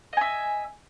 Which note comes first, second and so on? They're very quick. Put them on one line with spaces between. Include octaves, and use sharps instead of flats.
D#5 G#5 E5